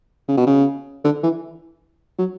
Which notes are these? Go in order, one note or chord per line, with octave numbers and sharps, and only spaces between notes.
C#3
B2
C#3
D3
E3
F#3